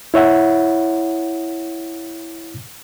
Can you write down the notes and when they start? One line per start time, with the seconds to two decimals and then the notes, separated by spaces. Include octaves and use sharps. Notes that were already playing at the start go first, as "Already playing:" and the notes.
0.14 E4 C#5 E5 F#5